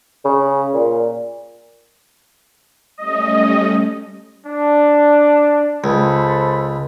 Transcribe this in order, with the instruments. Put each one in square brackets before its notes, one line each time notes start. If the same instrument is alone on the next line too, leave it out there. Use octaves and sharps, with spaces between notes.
[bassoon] C#3
A#2
[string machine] G3 A3 C#4 [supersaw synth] D#5
[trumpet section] D4
[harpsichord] C#2 [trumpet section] A4 C5 B5